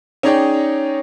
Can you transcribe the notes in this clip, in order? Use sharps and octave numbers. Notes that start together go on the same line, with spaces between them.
C#4 D#4 G#4 C#5 D5 G5